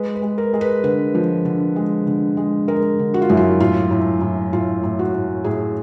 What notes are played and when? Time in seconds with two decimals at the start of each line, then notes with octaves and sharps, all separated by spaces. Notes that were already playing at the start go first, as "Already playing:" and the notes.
Already playing: G#3 B4
0.15 B4
0.22 G#3
0.38 A#4
0.53 G#3
0.61 B4
0.84 D3 B4
1.15 F3
1.45 D3
1.76 G#3
2.07 D3
2.37 G#3
2.68 G#3 A#4
2.99 D3
3.14 F#4
3.22 F4
3.29 F#2 E4
3.37 F4
3.60 A2 F4
3.91 A2
4.21 A2
4.53 A2 F4
4.83 A2
4.99 F#4
5.14 A2
5.44 A2 G#4